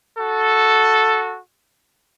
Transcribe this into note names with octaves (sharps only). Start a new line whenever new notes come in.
F#4 A4